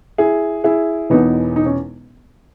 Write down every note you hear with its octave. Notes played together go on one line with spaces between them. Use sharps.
E4 G#4
E4 G#4
E1 E2 B2 B3 D#4
D#4
C#4